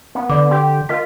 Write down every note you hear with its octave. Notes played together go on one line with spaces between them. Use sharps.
B3
D3 D5 D6
G4 C6
F4 A#4 D#5 B6